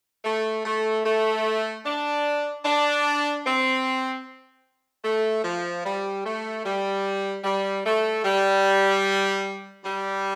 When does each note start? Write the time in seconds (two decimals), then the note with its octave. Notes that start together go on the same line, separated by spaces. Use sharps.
0.24 A3
0.65 A3
1.04 A3
1.85 D4
2.64 D4
3.45 C4
5.04 A3
5.44 F3
5.84 G3
6.25 A3
6.64 G3
7.43 G3
7.84 A3
8.23 G3
9.84 G3